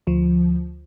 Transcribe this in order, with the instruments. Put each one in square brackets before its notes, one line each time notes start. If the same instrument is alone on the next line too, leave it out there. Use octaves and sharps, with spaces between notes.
[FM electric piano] D2 F3